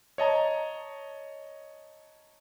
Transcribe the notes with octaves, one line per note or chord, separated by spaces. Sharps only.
C#5 D#5 A5 A#5